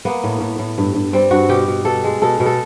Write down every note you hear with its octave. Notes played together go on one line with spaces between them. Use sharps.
A#3 B3
A2
A2
A2
G2
G2
G3 C4
G2 F#4
B2 G4
B2
B2 A4
G#3
B2 A4
B2
A4